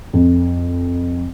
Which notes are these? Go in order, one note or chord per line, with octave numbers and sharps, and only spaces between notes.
F2